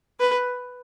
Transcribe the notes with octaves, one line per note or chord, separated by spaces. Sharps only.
B4